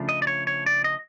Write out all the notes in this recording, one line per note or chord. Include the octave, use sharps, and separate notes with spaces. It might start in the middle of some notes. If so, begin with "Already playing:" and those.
Already playing: C#3 F3 A3 D4
D#5
D5
C#5
C#5
D5
D#5